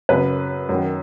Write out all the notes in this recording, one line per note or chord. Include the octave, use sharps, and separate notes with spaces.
F#2 C#3 B4
F#2 D#3